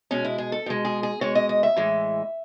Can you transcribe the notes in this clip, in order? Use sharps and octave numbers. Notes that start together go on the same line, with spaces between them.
B2 G#3 C#4
E4
G#4
A4
B2 G#3
G#4
G#4
B2 G#3 C#5
D#5
D#5
E5
A2 E3 G#3